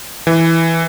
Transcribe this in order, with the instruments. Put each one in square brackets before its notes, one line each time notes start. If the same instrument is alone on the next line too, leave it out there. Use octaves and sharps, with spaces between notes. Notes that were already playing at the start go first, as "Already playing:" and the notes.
[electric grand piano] E3